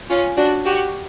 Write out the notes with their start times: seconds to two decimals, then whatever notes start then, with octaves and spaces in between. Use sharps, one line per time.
0.10 C#4 F4
0.37 D4 F#4
0.65 F#4 G4